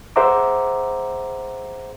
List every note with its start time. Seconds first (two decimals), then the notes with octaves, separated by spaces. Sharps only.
0.16 G#4 C5 E5 F#5 A#5 D6